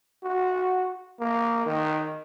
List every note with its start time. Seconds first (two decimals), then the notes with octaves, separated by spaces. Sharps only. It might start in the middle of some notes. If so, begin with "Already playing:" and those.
0.23 F#4
1.20 A#3
1.66 D#3